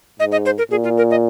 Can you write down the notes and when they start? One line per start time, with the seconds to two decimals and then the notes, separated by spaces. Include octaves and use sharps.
0.20 G#2 D#5
0.32 D#5
0.46 C5
0.58 A#4
0.71 A#2 G#4
0.84 F4
0.98 A#4
1.11 D#5